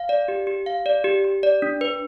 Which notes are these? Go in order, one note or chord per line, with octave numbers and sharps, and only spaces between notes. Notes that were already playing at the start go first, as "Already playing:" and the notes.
Already playing: F5
D5
G4
G4
F5
D5
G4
G4
D5
D4
B4